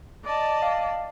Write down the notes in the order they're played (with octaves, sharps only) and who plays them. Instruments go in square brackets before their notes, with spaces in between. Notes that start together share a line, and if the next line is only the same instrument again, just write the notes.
[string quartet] D5 D#5 A5
[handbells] F5